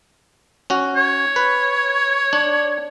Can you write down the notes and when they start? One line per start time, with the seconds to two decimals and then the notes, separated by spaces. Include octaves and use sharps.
0.70 C#4 F#4
0.96 C#5
1.36 B4
2.33 D4